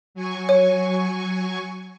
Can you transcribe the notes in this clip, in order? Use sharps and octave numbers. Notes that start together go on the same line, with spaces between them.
F#3 G#5 C#6
C#5